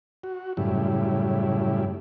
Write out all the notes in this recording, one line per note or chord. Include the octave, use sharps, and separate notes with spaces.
F#4
F#2 A2 C#3 G3 E4